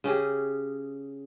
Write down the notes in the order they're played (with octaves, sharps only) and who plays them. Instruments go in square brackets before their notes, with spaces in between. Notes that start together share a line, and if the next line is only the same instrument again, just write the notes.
[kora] C#3 C#4 G4 G#4